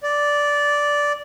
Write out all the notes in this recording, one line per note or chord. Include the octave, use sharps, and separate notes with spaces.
D5